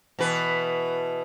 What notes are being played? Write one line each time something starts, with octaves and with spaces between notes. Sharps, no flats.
B2 E3 B4